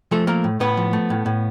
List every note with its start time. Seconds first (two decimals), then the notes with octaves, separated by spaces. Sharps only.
0.11 F3 A3 A4
0.27 A3 A#3 A#4
0.44 A2
0.60 A2 B3 B4
0.77 F3
0.93 A3
1.10 A2
1.26 A2